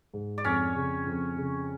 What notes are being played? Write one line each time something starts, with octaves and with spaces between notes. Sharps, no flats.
G#2
D5
F2 C#4 C#5
C#3
F2
C#3